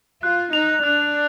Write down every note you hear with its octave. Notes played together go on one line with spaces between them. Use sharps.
F4 F#6
D#4 F7
D4 F#6